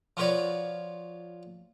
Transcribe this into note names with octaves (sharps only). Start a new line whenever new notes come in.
F3 F4 F#4 B4 C#5 D5